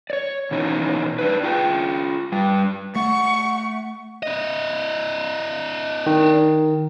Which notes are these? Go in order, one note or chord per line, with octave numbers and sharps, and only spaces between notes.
C#5 D5
B2 E3 C#4 D#4
D4 D#4 B4
F4 G#4 G5
G2 G3 G5
A3 F#5 C#6
D4 D#5
D#3